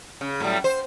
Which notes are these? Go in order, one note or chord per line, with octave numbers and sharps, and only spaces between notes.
C#3
A2 F#3 G3
C5